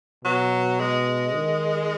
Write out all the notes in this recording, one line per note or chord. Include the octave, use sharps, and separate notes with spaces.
B2 F#3
G#3
D#3